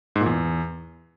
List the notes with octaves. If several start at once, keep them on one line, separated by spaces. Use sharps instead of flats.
G#2
A#2
E2